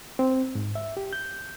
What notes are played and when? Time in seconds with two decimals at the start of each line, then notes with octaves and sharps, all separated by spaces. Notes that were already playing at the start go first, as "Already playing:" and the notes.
0.19 C4
0.55 G#2
0.75 E5
0.97 G4
1.13 G6